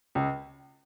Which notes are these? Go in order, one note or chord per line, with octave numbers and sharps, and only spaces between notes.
C#2